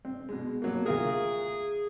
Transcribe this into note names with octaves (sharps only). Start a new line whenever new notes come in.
C4
B2 G#3
B2 F#3 A#3
D2 F4 G#4 A#4